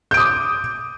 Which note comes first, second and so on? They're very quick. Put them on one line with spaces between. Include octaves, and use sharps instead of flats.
G6 D7 D#6 D6